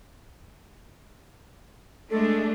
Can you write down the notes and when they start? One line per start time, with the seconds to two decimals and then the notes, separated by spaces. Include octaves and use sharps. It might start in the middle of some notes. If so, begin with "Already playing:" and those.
2.11 G#3 A3 D4 A4